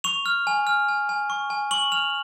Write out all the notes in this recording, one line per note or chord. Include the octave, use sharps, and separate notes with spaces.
C#6 F7
F6
G#5
F6
G#5
G#5
C#6
G#5
C#6 F#7
F6 F7